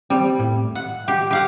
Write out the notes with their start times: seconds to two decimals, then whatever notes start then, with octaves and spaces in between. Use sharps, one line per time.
0.10 G3 C4
0.40 A2
0.75 F#5
1.08 G4
1.31 G4 F5 F#5